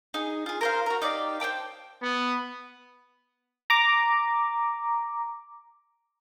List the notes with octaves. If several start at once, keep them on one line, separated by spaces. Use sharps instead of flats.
D#4 G#4
F4 G#4
A#4 C5 F5
F#4 A#4
D#4 G4 D5 F5
C5 D5 G5 A5
B3
A#5 D6